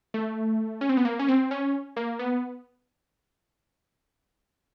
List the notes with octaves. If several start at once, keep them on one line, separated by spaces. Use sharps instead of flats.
A3
C#4
C4
B3
A#3
C#4
C4
C#4
A#3
B3